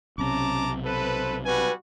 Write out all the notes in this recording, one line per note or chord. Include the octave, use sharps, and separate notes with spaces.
B1 C3 C#4 A5 A#5 D6
A4 B4 C5
G3 F#4 B4 G#5